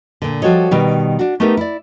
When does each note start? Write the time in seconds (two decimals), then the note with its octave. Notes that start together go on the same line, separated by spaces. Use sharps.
0.22 A#2 D3
0.42 F3 G3 F#4 A4 C#5 D#5
0.71 B2 D#3 G3
1.19 D4 F#4
1.40 A3 B3 D#4 G4 A#4
1.57 E4 D5